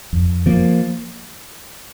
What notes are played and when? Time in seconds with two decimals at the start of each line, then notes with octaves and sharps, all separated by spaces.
0.13 F2
0.46 F3 A#3